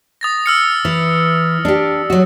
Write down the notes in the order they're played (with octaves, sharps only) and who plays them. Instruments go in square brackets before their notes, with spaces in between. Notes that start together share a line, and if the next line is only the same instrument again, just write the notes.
[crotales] D#6 A6 A#6
E6 F6 C#7
[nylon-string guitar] E3
D4 G4
F#3 F#4